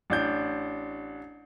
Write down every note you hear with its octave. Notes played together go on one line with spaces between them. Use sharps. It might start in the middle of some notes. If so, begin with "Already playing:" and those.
A1 D4 G6